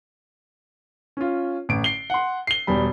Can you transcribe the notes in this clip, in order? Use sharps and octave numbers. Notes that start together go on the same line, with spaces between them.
C#4 F4
A1 D7
C7 G7
F#5 C6
C7 G7
E1 G3 B5